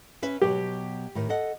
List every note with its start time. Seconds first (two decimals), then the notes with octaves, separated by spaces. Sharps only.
0.22 C#4 B4 E5
0.42 B2 F#3 G4
1.15 A2 D#3
1.29 A4 D#5 F#5